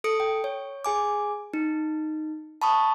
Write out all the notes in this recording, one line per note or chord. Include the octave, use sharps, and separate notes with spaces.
A4 D#6 C#7 D7
G5
C#5
G#4 G#5 D6
D#4
A5 B5 C#6 D#6